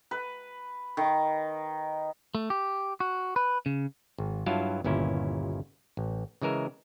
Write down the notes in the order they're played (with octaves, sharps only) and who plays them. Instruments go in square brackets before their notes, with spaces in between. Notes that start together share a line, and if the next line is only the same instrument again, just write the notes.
[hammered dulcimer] B4
D#3
[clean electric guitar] A3
G4
F#4
B4
C#3
[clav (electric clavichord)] G#1
G2 F#3 E4 F4 F5 A5
G1 D#2 A#2 C#4 E4
A1
C#3 E3 G#3 A#4 E5